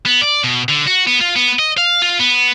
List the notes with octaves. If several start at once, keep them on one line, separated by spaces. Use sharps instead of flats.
B3
D5
B2
D3
F#4
B3
F4
B3
D#5
F5
F4
B3